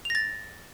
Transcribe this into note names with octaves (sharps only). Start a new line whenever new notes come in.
A6 A#6 F7